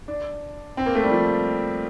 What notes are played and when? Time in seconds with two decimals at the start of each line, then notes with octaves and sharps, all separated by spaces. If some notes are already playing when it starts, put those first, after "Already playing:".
0.08 D4
0.77 C4
0.86 A#3
0.95 A3
1.03 G3
1.11 F3